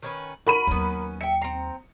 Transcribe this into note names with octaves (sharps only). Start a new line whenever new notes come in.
D#3 C#4 B4
F#4 A#4 B5 D#7
D#2 F#3 B3 C#4
E5 G5 C#7
C4 A#5